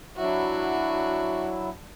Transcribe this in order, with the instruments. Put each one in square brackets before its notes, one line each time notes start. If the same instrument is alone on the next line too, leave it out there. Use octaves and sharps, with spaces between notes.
[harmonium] F#3 E4 [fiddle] D4 F#4